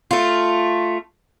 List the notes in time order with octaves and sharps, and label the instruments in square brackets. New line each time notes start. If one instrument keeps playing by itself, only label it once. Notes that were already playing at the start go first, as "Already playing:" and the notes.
[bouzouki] A3 F4